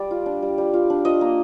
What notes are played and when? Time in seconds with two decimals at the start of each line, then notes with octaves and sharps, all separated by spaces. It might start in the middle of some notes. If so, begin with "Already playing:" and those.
Already playing: G3 D5
0.11 F4
0.26 D4
0.42 G3
0.58 G3
0.74 F4
0.90 D4
1.05 F4 D#5
1.21 A#3